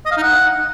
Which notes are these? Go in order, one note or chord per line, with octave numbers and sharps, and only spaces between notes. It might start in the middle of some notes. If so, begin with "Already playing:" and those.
D#5
F5
D#4
F#5